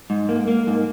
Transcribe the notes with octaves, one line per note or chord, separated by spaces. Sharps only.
G#2
A#3
A#3
G#2